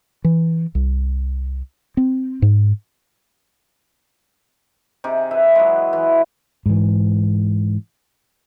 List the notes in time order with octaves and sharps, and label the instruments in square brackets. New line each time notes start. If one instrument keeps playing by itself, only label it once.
[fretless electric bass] E3
C2
C4
G#2
[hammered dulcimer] C3 D#4 G#4 D6
E4 B4 E5
F#3 G#3
E3
[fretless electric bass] G#2 E3